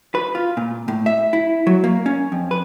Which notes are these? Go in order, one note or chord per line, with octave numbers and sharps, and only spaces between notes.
B4
F4
A#2
A2
E5
E4
F#3
A#3
C#4
F2
B4